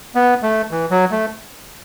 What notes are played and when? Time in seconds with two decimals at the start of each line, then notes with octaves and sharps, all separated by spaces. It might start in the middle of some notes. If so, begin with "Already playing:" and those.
0.15 B3
0.43 A3
0.71 E3
0.91 F#3
1.11 A3